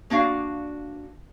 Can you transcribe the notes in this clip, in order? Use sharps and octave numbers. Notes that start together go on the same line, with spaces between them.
A#3 D4 F#4 F5